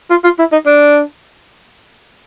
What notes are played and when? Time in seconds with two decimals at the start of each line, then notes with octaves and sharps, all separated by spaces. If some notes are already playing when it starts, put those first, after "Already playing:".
0.10 F4
0.24 F4
0.39 E4
0.52 D#4
0.66 D4